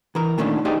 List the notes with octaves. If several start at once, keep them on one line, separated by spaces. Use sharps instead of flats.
E3 A#4
A#2 D#3 A3 C#4 D4
D#4 G4 G#4 C5 D5 D#5